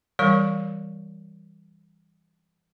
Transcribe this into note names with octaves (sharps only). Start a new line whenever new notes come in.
E3 G3 A#4 C#5 C#6